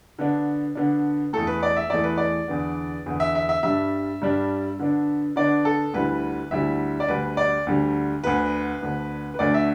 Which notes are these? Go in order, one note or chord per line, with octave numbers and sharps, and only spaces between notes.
D3 B3 D4
D3 B3 D4
E2 E3 A3 A4
B4
D5
E5
E2 E3 A3 D5
B4
D5
E2 D3 B3
E2 D3 B3
E5
E5
E5
G2 G3 D4 E5
G2 G3 D4
D3 B3 D4
D3 B3 D4 D5
A4
D2 D3 G3 E4 B4
D2 D3 G3 E4 E5
D5
D2 D3 G3 B4
D5
D2 D3 G3
D2 D3 B3 B4
D2 D3 B3
B4
D2 D3 A3 D4 D5
E5